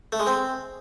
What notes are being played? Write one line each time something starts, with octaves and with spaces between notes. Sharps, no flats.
A3
G#3
C4